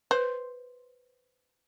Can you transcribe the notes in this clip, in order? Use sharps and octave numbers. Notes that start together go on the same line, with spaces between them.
B4 C5